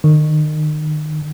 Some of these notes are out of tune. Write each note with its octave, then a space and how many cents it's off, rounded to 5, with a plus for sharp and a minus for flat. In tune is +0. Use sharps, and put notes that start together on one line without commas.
D#3 -30